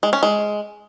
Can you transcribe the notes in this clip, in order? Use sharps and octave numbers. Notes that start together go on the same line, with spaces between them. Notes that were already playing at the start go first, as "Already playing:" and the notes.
G#3
C#4
G#3